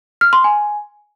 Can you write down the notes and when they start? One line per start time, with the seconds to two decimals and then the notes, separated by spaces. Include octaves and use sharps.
0.21 F6
0.33 C6
0.44 G#5